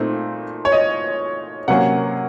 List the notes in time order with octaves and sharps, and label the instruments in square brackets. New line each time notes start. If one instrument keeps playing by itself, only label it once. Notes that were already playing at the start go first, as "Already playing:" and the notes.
Already playing: [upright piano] A#2 A3 C4 D#4
C#5
D#5
C3 F#3 A#3 C#4 F#5